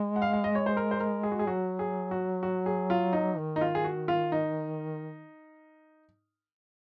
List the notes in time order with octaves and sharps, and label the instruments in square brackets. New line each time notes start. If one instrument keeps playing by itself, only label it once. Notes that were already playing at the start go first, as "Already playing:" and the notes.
Already playing: [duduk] G#3
[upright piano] F#5
F5
F5
D#5
C#5
C5
A#4
C5
A#4
G#4
F#4
G#4
[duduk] F#3 [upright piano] F#4
[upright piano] G#4
F#4
F#4
G#4
F4
D#4
[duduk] D#3
[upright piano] D#4
F4
G#4
F#4
F4
D#4